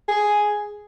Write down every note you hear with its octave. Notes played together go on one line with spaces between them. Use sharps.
G#4